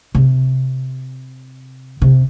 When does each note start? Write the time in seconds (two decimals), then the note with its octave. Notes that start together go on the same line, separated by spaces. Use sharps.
0.15 C3
2.02 C3